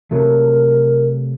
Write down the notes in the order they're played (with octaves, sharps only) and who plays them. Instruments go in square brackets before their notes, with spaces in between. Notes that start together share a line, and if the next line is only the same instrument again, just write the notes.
[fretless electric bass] C3 F#3 A3 [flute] A#4